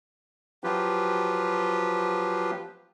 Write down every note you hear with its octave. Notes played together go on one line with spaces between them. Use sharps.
F3 F#3 F4 G4 B4